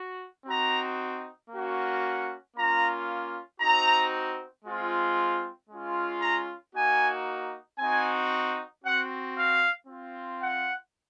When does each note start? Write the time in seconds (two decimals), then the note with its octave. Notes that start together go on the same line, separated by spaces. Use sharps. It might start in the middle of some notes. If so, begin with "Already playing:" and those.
Already playing: F#4
0.46 C4 D#4 F#4 A#5
1.50 A#3 C#4 F#4
2.55 A#3 C#4 F4 A#5
3.59 C4 D#4 F#4 A#5
4.65 G#3 C4 F4
5.70 G#3 C#4 F4
6.21 A#5
6.74 A#3 D#4 F#4 G#5
7.78 C4 D#4 F#4 G#5
8.82 C4 F#4 F#5
9.35 F5
9.87 C4 F4
10.41 F#5